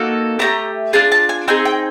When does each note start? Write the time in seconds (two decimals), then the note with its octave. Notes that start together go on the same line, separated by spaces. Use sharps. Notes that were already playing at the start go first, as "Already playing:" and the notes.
Already playing: A#3 D#4 F#4 A4
0.39 A3 D4 G4 A#5
0.93 D4 F4 G#4 A5
1.12 A5
1.29 G#5
1.48 C4 D#4 G#4 G#5
1.65 G5